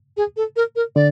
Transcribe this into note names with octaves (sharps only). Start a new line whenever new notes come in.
G#4
A4
A#4
A#4
D3 D5